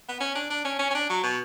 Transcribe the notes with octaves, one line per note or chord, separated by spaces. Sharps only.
B3
C#4
D4
D4
C#4
C#4
C#4
D4
F#3
B2